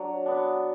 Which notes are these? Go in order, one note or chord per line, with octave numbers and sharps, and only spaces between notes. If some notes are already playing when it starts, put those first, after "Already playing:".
Already playing: F#3 D4
B3 D4